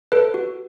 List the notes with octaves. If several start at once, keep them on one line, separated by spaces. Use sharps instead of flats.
A4 B4
F#4